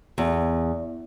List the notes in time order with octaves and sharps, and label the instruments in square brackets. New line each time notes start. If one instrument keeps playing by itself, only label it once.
[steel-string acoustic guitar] E2